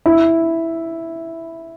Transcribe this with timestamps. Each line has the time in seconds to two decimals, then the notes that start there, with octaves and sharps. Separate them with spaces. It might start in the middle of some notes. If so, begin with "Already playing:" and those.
0.06 E4